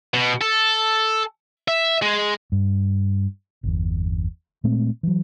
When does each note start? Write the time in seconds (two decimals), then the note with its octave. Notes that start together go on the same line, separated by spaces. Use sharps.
0.14 B2
0.41 A4
1.68 E5
2.02 G#3
2.52 G2
3.63 G1 E2
4.64 A#2 G#3 A3 C4
5.03 E3 F#3